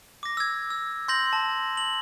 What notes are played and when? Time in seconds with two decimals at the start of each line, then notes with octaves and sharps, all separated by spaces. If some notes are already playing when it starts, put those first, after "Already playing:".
0.23 D6 A#6
0.37 E6 G#6
0.70 E6
1.08 C6 G6 A#6 F#7
1.33 A5
1.77 F#7